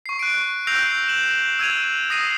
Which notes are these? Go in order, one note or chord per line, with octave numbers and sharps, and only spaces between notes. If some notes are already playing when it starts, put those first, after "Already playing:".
C#6 C7
F#6 D7
E6 G6 A#6 C7 D7 F7
E7 F#7
E6 G#6 D#7 F7
D#6 A#6 C7 D#7